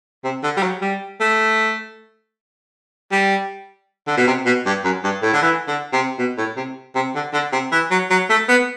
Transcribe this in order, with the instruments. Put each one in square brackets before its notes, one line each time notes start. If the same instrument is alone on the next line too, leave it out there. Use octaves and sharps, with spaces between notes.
[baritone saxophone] C3
D3
G3
F#3
G3
A3
G3
D3
B2
C3
B2
G2
F#2
G2
A2
D3
E3
D3
C3
B2
A2
C3
C3
D3
D3
C3
E3
F#3
F#3
A3
B3